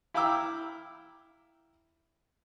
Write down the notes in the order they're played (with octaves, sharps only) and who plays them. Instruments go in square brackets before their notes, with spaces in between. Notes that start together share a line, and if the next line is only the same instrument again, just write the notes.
[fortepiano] E4 F5 G5 A#5 D6 E6